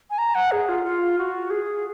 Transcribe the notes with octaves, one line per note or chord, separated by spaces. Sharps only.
G#5
A#5
F#5
G#4
F4
F4
F#4
G#4